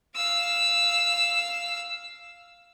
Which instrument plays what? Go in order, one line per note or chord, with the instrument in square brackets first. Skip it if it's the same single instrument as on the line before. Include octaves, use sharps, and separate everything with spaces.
[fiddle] F5 E6